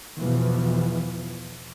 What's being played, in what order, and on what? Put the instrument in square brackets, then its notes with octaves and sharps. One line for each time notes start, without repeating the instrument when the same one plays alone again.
[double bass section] E2 B2 E3 F3